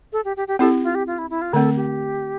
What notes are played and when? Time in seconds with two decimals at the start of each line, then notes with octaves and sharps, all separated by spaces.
0.13 A4
0.25 G4
0.37 G4
0.48 G4
0.59 C4 E4 G4 A4
0.83 F4
0.95 G4
1.07 F4
1.18 E4
1.30 E4
1.42 F4
1.53 D3 A3 C4 A4
1.76 G4